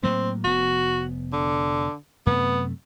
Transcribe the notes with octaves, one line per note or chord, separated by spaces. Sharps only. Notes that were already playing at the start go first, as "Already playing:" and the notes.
A2 F#3 A#3 C4
F1 B3 F#4
D3
F#2 C3 A3 B3